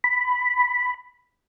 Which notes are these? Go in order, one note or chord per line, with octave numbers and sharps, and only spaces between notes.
B5